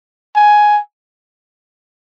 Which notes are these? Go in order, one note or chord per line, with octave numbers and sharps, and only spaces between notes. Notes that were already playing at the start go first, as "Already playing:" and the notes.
G#5